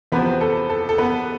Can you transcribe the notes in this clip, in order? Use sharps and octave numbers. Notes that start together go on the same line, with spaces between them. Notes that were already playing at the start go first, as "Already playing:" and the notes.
E2 C3 F3 B3 C4 B4
A4
A4
A4
B3 B4